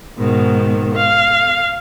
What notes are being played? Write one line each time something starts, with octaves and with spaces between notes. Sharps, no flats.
G#2 B2 D#3
F5